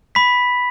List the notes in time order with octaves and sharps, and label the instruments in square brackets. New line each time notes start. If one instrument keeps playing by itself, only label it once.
[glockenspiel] B5 B6